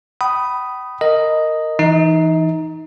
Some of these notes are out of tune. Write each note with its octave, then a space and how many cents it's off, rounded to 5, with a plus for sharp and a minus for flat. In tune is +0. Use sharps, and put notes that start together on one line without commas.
G5 -45 B5 +0 D#6 +0
A#4 -15 D#5 +0
E3 +0 D#4 +5 D#5 +45